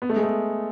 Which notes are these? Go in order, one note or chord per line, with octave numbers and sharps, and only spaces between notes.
B3
A3
G#3
A3